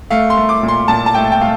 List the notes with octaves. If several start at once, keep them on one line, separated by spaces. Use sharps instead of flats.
A3 F5
C6
A3
D6
A#2
C6
A#2 A5
A5
A3 G5
G5
A3 F5